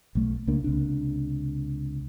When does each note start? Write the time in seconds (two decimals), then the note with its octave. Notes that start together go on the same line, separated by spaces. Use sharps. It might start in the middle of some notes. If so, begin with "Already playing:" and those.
0.15 B1 A3
0.47 C#2 A3 A#3 D4
0.64 C#2 C3 D4